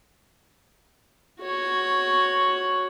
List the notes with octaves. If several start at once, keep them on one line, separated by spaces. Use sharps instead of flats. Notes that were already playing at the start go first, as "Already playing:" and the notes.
F#4 C#5